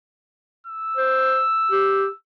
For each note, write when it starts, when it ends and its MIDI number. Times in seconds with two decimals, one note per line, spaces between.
0.67 2.16 88
0.97 1.42 72
1.71 2.06 67